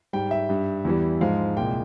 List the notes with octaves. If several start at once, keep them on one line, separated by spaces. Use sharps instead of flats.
G#2 G3 G5
E5
G2 G3
E2 E3 G3
G#2 F3 G#3 F5
C2 A#2 G#3 G5